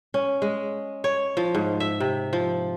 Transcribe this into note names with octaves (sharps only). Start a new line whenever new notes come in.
C#4
G#3
C#5
F3
G#2
E5
C3
F3